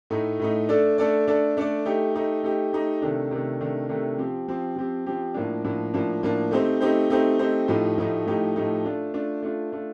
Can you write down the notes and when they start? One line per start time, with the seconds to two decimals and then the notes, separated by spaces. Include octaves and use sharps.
0.10 A2 A3 D#4
0.39 A2 A3 D#4
0.69 A3 D4 A4 D5
0.98 A3 D4 A4 D5
1.27 A3 D4 A4 D5
1.57 A3 D4 A4 D5
1.85 A3 D#4 G4
2.14 A3 D#4 G4
2.43 A3 D#4 G4
2.73 A3 D#4 G4
3.02 C3 D#3 A3 D4
3.31 C3 D#3 A3 D4
3.60 C3 D#3 A3 D4
3.89 C3 D#3 A3 D4
4.18 F3 C4 G4
4.48 F3 C4 G4
4.76 F3 C4 G4
5.06 F3 C4 G4
5.34 A2 F3 A#3 D4
5.64 A2 F3 A#3 D4
5.94 A2 F3 A#3 D4
6.23 A2 F3 A#3 D4
6.51 A3 C4 D#4 G4 C5
6.80 A3 C4 D#4 G4 C5
7.10 A3 C4 D#4 G4 C5
7.39 A3 C4 D#4 G4 C5
7.68 A2 F3 A3 D#4 G4
7.98 A2 F3 A3 D#4 G4
8.26 A2 F3 A3 D#4 G4
8.55 A2 F3 A3 D#4 G4
8.84 A3 D4 F4
9.14 A3 D4 F4
9.43 A3 D4 F4
9.72 A3 D4 F4